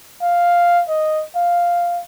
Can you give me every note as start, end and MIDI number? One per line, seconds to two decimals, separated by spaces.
0.22 0.84 77
0.89 1.24 75
1.36 2.02 77